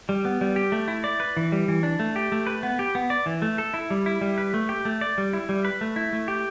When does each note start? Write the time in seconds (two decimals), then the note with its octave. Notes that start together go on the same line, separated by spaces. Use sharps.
0.09 G3
0.25 B3
0.41 G3
0.56 G4
0.72 A3
0.88 E4
1.04 D5
1.20 B4
1.37 E3
1.52 G3
1.68 E3
1.83 D4
1.99 A3
2.16 G4
2.32 A3
2.47 B4
2.63 B3
2.79 G4
2.95 B3
3.10 D5
3.26 E3
3.42 A3
3.58 A4
3.74 E4
3.90 G3
4.06 E4
4.21 G3
4.38 B4
4.54 A3
4.69 G4
4.85 A3
5.01 D5
5.18 G3
5.33 E4
5.49 G3
5.65 B4
5.81 A3
5.96 E4
6.13 A3
6.28 G4